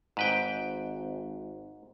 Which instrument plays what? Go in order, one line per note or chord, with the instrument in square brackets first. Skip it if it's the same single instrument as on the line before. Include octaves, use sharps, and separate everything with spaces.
[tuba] G#1 [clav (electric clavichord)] G#2 B4 G5